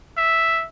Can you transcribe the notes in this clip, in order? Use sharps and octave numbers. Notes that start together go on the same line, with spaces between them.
E5